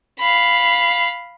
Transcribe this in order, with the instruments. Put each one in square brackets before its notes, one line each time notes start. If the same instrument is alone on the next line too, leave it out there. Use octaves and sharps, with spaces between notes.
[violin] F5 B5